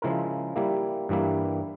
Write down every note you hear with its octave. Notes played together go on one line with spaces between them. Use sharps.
C#3 F3 G#3 E4 A#4
G3 A#3 E4
G2 E3 G3 A#3 E4